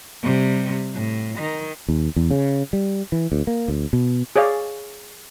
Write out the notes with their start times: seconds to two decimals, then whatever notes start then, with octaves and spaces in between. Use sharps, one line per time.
0.23 C3 G3
0.94 A2
1.39 D#3
1.88 D#2
2.16 E2
2.31 C#3
2.73 G3
3.12 E3
3.32 D2
3.47 A#3
3.68 D2
3.93 B2
4.36 G#4 C#5 D5 F5